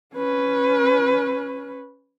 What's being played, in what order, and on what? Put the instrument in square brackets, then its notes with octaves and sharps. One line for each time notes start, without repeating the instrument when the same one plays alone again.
[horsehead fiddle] C#4 B4